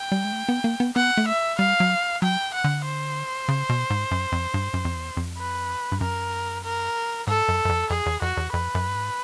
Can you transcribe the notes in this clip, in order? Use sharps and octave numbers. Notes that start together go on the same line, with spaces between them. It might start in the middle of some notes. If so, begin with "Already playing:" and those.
Already playing: G5
G3
G#3
A3
B3
A#3
B3
B3 F#5
A3
E5
G3 F5
F#3
F#3 G5
F#5
D3
C5
C#3
B2
G#2
F#2
F2
G2
F#2
F2
E2
F2
B4
G2
F#2 A#4
A#4
G#2 A4
F#2
F#2
F2
F2 G#4
E2
F2 F#4
E2
F2 B4
F#2
G2
G#2